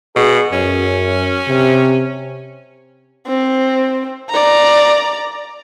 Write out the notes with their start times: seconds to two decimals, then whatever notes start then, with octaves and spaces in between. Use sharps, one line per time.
0.16 B2 G#4
0.53 F#2 C#4
1.48 C3
3.27 C4
4.30 D5 A#5